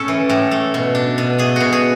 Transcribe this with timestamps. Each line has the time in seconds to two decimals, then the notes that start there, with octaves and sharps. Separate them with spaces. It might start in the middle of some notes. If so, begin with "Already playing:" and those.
Already playing: A2 A3 C#4 A4
0.08 E3
0.29 A2
0.51 A3
0.74 B2
0.95 D4
1.18 B2
1.38 A3 G#4
1.56 B2 F#4
1.73 G#4